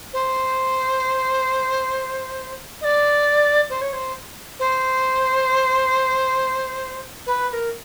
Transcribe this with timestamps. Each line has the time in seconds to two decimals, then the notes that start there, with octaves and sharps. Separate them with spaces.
0.13 C5
2.80 D#5
2.84 D5
3.69 C5
3.81 C#5
3.92 C5
4.59 C5
7.26 B4
7.48 B4
7.52 A#4